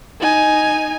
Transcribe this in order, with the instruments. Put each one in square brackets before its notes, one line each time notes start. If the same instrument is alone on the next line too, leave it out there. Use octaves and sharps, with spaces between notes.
[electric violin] D#4 G#5